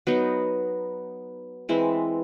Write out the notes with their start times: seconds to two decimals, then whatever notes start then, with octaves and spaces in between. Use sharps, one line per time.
0.07 F#3 B3 D#4
1.69 E3 G#3 C4 E4